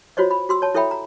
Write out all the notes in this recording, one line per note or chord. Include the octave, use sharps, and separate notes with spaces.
F4 F#4 C5 C#5 D#5
B5
F#4 C6 E6
C#5 A5
E4 A4 C#5 E5 G5 B5
A#5